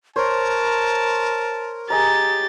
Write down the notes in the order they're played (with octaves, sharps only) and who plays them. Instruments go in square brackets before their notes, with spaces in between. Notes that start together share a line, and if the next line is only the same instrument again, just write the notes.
[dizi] A#4 [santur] C5 C#5 [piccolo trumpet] A5
[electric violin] G4 A6 [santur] G#4 D#5 A#5